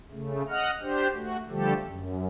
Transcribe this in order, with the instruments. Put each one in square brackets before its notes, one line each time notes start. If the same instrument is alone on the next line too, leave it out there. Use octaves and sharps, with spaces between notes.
[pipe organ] C#3 A3
D#5 F#5 F6
D4 G4 C5
A3 F#4
D3 F3 G3 A3 G4 A4
F#2